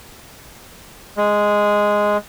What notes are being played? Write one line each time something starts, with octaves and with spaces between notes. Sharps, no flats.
G#3